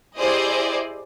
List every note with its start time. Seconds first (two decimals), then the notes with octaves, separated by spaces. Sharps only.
0.19 E4 G4 G#4 C5 D5 D#5